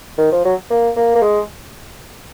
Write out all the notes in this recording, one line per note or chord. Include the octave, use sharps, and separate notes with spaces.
D#3
F3
F#3
A#3
A#3
A#3
G#3